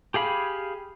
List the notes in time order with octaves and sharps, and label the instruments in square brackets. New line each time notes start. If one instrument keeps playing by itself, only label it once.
[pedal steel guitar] G4 G#4 F5 B5